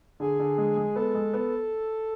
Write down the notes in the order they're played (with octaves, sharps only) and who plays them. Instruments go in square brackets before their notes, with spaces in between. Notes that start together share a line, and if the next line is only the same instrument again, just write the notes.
[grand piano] D3 [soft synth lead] G#4
[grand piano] D3
G#3
G#3
[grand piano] B3 [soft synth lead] A4
[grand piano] G#3
B3